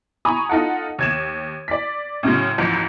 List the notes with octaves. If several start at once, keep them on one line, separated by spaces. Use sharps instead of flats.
G#5 A#5 B5 C#6 D#6
D#4 F4 A4 F#5
D#2 G#6 E7
D5 B6
A2 C#3 F#3 G#3
F#1 C#2 G#2 E3 F3